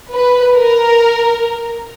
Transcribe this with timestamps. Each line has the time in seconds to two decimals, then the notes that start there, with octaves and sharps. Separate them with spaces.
0.13 B4
0.55 A#4